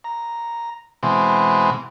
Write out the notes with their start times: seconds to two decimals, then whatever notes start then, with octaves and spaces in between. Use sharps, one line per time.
0.04 A#5
1.03 B2 E3 G#3 C4